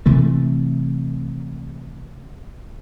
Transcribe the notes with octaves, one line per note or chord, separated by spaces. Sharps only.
C3 E3 A3